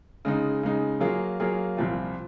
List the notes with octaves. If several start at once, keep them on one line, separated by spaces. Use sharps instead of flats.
C#3 G#3 D#4
C#3 G#3 D#4
F#3 A#3 F4 G#4
F#3 A#3 F4 G#4
C2 A#2 F3 C4 F4